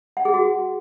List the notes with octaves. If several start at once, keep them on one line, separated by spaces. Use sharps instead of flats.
F#5
G#4
F#4